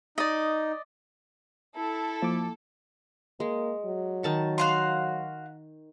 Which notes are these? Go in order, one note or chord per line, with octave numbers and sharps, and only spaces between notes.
D#4 D5 D#5
E4 A4
F3 A#3 D6
G#3 A#3
F#3
D#3 A5 C#6
F#4 F5 C6